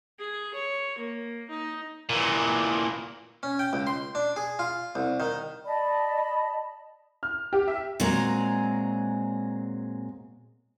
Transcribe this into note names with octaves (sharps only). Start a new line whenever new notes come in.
G#4
C#5
A#3
D#4
A#2 E3
C#4
G5
C#2
C6
D4
G#4
F4
C2
D#3
D5 D#5 A5 B5
F6
G4
E5
A#2 F#3 G#3 C4 G#4 A#5